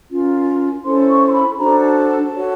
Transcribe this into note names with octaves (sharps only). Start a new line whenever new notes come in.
C#4 F4 A#4
C#4 E4 A4 C5 C6
C#6
C6
B5
D4 F#4 A4 C5 A#5
A5
A5
F#4 A4 C#5